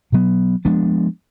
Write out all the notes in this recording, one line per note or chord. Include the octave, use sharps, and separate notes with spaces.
B2 F#3 B3
F3 G#3 B3 D4